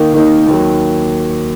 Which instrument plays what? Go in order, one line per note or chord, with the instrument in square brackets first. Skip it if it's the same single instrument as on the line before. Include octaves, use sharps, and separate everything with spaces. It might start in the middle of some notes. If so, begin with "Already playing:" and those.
Already playing: [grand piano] D#3 A#3 D#4
D#3 A#3 D#4
D#2 D#3 F#3